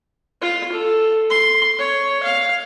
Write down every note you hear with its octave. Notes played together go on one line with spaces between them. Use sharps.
F4
A4
C6
C#5
F5